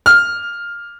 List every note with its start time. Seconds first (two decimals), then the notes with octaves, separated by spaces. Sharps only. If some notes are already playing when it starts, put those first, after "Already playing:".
0.06 F6